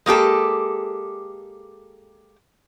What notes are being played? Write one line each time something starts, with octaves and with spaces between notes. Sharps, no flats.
G#3 A#3 G4 A4